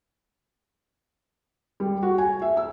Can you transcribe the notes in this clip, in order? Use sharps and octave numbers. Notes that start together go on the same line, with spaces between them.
G3
F#4
G#5
E5
E6